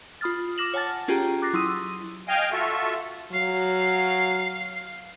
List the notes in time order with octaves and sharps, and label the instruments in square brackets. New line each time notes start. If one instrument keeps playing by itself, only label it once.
[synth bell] F4 B5 D#6 F6 A6
D6 F6 A#6 E7 F#7
C#5 F#5 G#5 A5 F6 A6
C#4 F4 G4 G#4 G5 A#5
D6 F#6 A6 A#6 C7
F#3 E4 C6 D#6 E6 D#7
[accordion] D#5 F5 G5 G#5
F4 F#4 A4 E5
[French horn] F#3 [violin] F5 C7